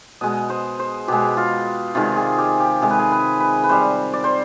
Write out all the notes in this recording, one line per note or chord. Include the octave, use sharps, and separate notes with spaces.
B2 G#3 D#5
C5
C5
B2 G#3 G4
F4
C3 D#3 G#3 F4
G#4
G4
G4
C3 D#3 G#3 G#4
B4
G#4
B4
B4
B4
C3 G3 C5
D5
C5